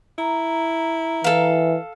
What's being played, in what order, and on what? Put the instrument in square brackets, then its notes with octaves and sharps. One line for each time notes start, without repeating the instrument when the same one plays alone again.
[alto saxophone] E4 [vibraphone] A#5
[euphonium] E3 [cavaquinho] A4 F5